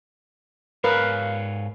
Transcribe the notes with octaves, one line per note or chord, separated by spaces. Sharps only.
G#2 A#4 B4 C#5 F5